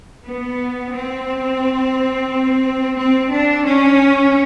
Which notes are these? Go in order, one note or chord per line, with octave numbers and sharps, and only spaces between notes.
B3
C4
C4
D4
C#4